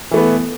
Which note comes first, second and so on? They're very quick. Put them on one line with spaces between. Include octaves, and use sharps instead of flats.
E3 A3 B3